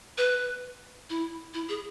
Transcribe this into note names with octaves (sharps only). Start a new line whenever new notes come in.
B4
E4
E4
G#4